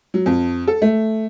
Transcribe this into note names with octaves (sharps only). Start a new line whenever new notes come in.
F#3
F2
A4
A3